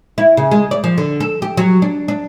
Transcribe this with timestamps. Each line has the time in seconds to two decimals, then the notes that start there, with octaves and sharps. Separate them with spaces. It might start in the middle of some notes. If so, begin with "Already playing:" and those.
0.18 E4
0.37 C#3
0.51 G#3
0.71 D5
0.84 F3
0.98 D3
1.20 A4
1.42 G4
1.57 F#3
1.82 D4
2.08 D4